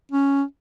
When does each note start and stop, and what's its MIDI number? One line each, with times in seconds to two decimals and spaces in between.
0.12 0.43 61